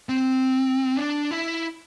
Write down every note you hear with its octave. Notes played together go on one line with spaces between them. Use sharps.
C4
D4
E4